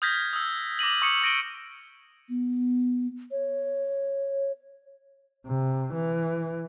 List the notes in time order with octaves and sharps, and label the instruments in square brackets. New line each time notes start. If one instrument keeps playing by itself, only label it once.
[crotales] D#6 F6 G6 G#6 A#6 B6
D#6 E6
D6 A#6 D#7 F#7
C#6 D#6 C#7 D#7 F#7
C#6 A#6 D7 D#7 G7
[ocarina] B3
C#5
[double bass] C3
E3